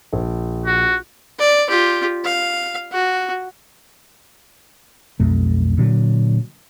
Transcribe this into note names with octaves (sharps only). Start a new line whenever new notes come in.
A#1
F#4
D5
F4 G4
F5
F#4
B1 F2 A3
A#2 D3 F#3